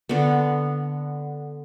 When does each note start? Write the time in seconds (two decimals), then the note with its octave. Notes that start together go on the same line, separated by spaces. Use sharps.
0.09 D3 B3